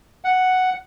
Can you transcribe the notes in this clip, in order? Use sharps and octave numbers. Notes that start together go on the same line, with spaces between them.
F#5